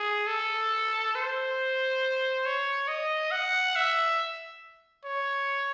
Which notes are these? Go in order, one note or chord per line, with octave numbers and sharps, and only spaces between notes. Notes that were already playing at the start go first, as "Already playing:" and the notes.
Already playing: G#4
A4
C5
C#5
D#5
F#5
E5
C#5